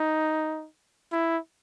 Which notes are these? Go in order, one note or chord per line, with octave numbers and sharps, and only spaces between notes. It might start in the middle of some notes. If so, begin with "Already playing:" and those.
Already playing: D#4
E4